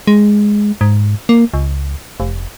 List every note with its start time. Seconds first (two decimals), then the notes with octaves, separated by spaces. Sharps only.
0.07 G#3
0.81 G#2
1.29 A#3
1.54 C#2
2.20 F1